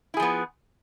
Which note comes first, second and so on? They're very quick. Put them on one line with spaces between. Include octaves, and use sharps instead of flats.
E4 G#4 F3 B3